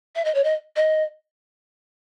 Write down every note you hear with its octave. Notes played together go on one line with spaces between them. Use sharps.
E5
D#5
C#5
D#5
D#5